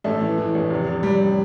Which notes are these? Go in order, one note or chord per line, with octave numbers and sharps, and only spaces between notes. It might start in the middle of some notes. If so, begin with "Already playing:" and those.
A1 A3
E3
E3
A1
F1
F1
F1 G3
F1